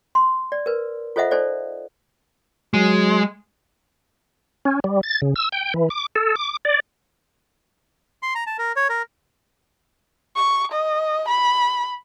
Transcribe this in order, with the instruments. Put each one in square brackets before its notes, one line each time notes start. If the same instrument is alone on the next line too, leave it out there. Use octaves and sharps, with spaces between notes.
[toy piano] C6
D5
A#4 B4
F4 A4 C5 D#5 E5 F#5
D#4 A4 C5 D5
[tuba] F#3 [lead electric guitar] G#3
[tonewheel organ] C#4
G3
A6
C#3
E6
G5
E3
D6
A4
D6
D5
[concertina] C6
A#5
A5
A#4
C#5
A#4
[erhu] C#6
D#5
B5